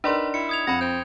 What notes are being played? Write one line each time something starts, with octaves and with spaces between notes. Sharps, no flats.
D4 D#4 A#4 B4 D5 C6
E4 C#7
D#6 G#6 F7
F2 F#5 B5 A#6
C4 G6